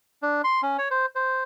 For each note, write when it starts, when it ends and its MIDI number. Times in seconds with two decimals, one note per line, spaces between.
0.23 0.42 62
0.44 0.61 84
0.62 0.77 61
0.78 0.89 73
0.91 1.06 72
1.15 1.44 72